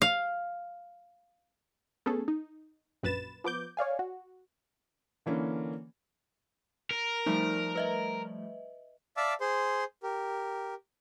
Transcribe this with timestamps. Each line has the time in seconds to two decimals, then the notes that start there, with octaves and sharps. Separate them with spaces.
0.02 F5
2.06 A3 B3 C#4 G#4 A4
2.28 D#4
3.03 A#1 F#2 B4 A6 E7
3.44 F3 B3 D6 G6
3.77 C#5 D5 F5 G#5
3.99 F#4
5.26 D3 E3 A#3 C#4
6.91 A#4
7.26 F3 G3 A3 D#4
7.75 B4 D#5 E5
9.17 D5 E5 F5 A5 D6 E6
9.41 G#4 C5 C6
10.03 G4 A#4